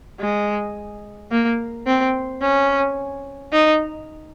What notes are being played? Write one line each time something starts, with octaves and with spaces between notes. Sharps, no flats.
G#3
A#3
C4
C#4
D#4